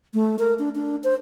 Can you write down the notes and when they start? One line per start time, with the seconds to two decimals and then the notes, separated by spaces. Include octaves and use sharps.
0.14 A3
0.39 A#4
0.59 D4
0.75 D4
1.04 C5